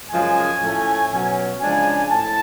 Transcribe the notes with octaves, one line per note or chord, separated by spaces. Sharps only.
F#2 C#3 F3 G#3 C#4 G#5
A2 F3 A3 C#4
B2 F#3 C#4
C#3 F3 G#3 D4 G#5
A2 A5